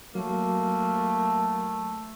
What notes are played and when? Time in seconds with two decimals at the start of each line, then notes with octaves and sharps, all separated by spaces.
0.15 F#3 A3 A#3